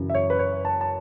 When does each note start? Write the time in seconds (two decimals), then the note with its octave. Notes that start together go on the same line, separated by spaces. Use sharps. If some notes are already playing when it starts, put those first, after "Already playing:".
Already playing: F#2 C#3 E3
0.10 E5
0.14 C#5
0.30 B4
0.39 C#5
0.65 A5
0.81 A5